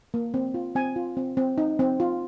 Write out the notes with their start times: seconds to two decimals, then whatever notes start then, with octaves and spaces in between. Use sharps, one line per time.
0.14 A#3
0.34 C4
0.54 F4
0.75 C4 G#5
0.96 F4
1.17 C4
1.37 C4
1.58 D#4
1.79 C4
2.00 F4